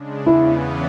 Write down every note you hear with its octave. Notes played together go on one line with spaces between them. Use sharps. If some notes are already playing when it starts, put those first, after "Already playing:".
Already playing: C#3 G#3 D4
E2 C#3 E3 B3 E4